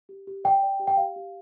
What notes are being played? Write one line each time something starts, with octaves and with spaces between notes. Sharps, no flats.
G4
G4
D5 G5
D5
G4
G5
G4 F5
G4